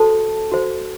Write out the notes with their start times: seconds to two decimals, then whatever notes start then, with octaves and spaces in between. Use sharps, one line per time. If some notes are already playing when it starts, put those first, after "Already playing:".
Already playing: F#4 A4 C5 A5
0.52 F#4 C5